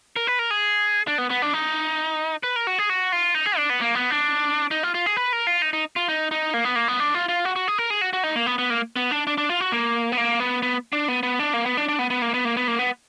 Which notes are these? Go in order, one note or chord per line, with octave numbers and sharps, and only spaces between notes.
A#4
B4
A#4
G#4
D4
B3
B3
D4
D#4
B4
A#4
F#4
G#4
F#4
F4
D#4
G#4
D4
B3
A#3
B3
D4
D#4
F4
F4
G#4
B4
A#4
F4
D#4
D#4
F4
D#4
D#4
A#3
B3
A#3
B3
D4
F4
F4
F#4
F#4
G#4
A#4
G#4
F#4
F#4
D#4
A#3
B3
B3
A#3
B3
D4
D4
D4
F4
F#4
A#3
B3
A#3
B3
B3
D4
B3
B3
D4
A#3
B3
D4
D4
B3
B3
A#3
B3
A#3
B3
A#3
B3